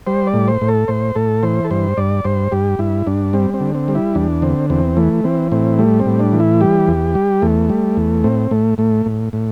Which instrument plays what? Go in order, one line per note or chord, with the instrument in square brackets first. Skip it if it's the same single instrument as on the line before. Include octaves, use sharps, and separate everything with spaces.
[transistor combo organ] G3 C5
D5
A2
C5
A2
A4
A2 C5
A2 A4
E3 C5
A4
G2 C5
G2 D5
G2 C5
G2 G4
G2 E4
G2 D4
G3 C4
C4
D3
C4
G3
E4
E2 D4
D3 C4
E2 C4
E3 A3
E3 C4
A2 C4
G3 A3
C4
A2
D4
E3
E4
G3 G4
E2
G3
E2 A3
G3
E2
A2 C4
A2 A3
A2 A3
A2
A2